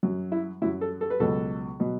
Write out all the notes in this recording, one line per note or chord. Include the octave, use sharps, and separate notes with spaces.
F#2 F#3
E4
F#2 F#3 E4
A4
A4
B4
C#2 B2 F#3 A4
B2 F#3